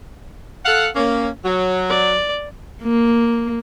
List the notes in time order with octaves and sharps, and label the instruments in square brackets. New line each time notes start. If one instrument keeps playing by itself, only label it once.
[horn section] A4 F5 F#5
A#3 C#4
F#3
[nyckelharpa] D5
[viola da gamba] A#3